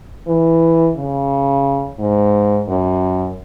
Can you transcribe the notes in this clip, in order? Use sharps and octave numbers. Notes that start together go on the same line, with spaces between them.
E3
C#3
G#2
F#2